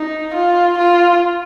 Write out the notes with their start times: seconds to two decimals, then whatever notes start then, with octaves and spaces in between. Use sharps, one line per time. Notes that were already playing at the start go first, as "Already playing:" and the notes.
Already playing: D#4
0.34 F4
0.77 F4